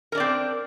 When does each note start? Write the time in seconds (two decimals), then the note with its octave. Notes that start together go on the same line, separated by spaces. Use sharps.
0.12 A#4
0.15 D4
0.17 D5
0.20 C4